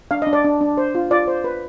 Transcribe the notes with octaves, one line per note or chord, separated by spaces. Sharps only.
D4 F5
D#5
D4
D5
D4
D4
C5
F4
F4 D5
C5
B4